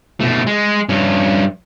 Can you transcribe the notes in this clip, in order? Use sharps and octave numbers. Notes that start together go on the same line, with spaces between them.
B2 A3
G#3
G2 C#4